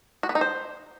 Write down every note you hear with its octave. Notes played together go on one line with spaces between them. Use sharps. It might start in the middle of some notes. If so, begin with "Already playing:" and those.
F#4
B3
D#4
C5